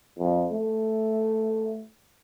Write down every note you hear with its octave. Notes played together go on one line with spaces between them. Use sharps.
F2
A3